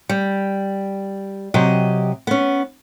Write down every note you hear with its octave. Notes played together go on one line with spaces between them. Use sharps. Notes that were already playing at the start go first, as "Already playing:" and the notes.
G3
C3 F#3 G4 D#5
B3 C#4